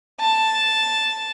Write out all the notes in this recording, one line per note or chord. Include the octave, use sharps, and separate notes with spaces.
A5